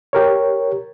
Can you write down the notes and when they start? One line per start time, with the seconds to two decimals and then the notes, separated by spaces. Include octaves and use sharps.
0.13 G4 A#4 C#5